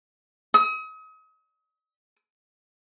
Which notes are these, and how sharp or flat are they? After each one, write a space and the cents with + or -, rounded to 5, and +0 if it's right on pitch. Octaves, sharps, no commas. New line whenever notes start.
D#6 +40